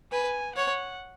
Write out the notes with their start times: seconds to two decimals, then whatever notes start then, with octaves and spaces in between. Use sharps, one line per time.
0.12 B4 G#5
0.55 C#5 F#5